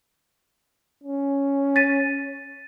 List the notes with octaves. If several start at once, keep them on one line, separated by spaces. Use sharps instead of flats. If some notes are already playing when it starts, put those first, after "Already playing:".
C#4
A6 B6 D#7